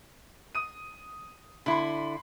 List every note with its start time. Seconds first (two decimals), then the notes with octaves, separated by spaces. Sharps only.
0.55 D#6 D#7
1.66 D3 E4 B5 C6